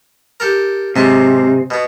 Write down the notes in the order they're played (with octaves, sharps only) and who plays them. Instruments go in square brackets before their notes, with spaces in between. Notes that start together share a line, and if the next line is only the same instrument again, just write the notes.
[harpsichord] G4 A4 A#4
[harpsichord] G#2 F#3 A5 [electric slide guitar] C3
[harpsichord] B2 B3